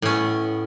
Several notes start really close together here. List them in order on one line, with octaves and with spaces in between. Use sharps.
A2 C#4 B3